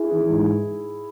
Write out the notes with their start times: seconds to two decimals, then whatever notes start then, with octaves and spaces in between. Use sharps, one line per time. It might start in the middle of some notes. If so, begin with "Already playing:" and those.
Already playing: E4 G#4
0.12 E3
0.30 G#2